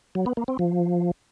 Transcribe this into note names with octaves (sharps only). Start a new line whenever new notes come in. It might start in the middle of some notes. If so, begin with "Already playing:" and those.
F#3
B3
A#3
C4
F3